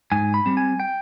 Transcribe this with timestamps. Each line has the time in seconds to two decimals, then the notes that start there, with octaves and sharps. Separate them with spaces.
0.12 G#2 G#5
0.34 B5
0.46 G3 C4
0.57 G#5
0.80 G5